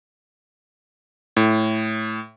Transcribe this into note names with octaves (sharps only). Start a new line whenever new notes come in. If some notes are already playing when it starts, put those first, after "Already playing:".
A2